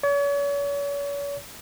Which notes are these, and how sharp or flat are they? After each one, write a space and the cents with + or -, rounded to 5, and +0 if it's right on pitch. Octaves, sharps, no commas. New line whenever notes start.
C#5 +40